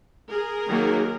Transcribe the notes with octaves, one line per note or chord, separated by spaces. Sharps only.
G#4 A#4
D#3 F#3 A#3